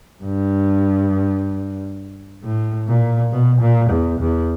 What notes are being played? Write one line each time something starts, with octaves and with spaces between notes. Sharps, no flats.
G2
A2
A#2
B2
A#2
E2
E2